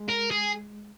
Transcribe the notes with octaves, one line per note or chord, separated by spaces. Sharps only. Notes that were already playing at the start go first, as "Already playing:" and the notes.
Already playing: G#3
A#4
G#4